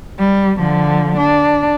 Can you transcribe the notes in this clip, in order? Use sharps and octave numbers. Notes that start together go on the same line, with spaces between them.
G3
D3 F3
D4